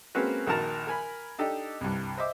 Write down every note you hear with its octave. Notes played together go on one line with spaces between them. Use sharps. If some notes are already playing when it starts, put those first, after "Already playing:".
G#3 A#3 C4 C#4 F#4 B4
A#1 D#3 F#4 A#4 A5 A#5
A#4 G#5 B5
D4 D#4 G4 A4 D#5
C2 G2
C5 D#5 E5 D6